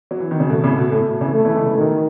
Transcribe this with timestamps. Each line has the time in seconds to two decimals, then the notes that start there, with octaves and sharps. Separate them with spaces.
0.11 F#3
0.20 E3
0.31 D#3
0.40 C#3
0.49 B2 A3
0.64 A2 C#3
0.78 B2
0.92 A2 A3
1.21 C#3 E3
1.35 A3
1.45 C#3 E3
1.56 E3 G#3
1.66 C#3 E3
1.77 B2 D#3